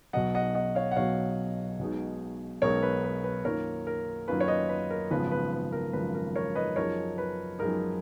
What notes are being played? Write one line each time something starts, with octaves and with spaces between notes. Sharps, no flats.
B1 B2 F#3 D#5 F#5
D#5 F#5
D#5 F#5
C#5 F5
F#5
B1 B2 F#3 C#5 F5
B1 B2 G#3 D#4
B1 B2 G#3 D#4 A#4 C#5
B4
B4
B4
F#2 D#3 A#3 C#4 F4 A#4 C#5
A#4
F#2 D#3 A#3 C#4 F4 B4
C#5
B4 D#5
B4
A#4
G#1 F#2 C#3 F3 B3 B4
B4
B4
A#4
G#1 F#2 C#3 F3 B3 B4
A#4
A#4 C#5
B4 D#5
F#2 F3 G#3 D#4 A#4 C#5
B4
F#2 F3 G#3 D#4 A#4